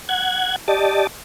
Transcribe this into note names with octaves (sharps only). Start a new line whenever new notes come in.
F#5 G#6
G4 D5 D#5 A5